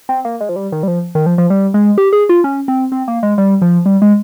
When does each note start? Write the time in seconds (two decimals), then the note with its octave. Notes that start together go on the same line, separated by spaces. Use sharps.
0.09 C4
0.25 A#3
0.41 G#3
0.49 F3
0.56 G3
0.72 D#3
0.83 G3
0.88 F3
1.15 D#3
1.26 F3
1.38 F3
1.50 G3
1.74 G#3
1.98 G4
2.13 G#4
2.29 F4
2.44 C#4
2.68 C4
2.92 C4
3.08 A#3
3.23 G#3
3.38 G3
3.62 F3
3.86 G3
4.02 G#3